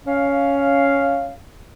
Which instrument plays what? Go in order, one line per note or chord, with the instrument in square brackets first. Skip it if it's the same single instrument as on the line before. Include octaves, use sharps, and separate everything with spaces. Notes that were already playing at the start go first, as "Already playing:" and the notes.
[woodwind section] C#4 F5